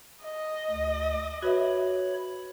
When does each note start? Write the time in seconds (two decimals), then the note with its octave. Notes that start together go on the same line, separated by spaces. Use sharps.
0.23 D#5
0.71 D2
1.42 F#4 B4 C#5 E5 B5